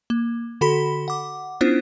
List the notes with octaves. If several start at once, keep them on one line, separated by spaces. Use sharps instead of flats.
A#3
D3 F#4 A4 B5 B6
F#5 D6
B3 C#4 D4 E4 F4 C5